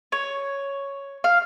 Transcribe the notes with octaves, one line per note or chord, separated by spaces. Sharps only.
C#5
F5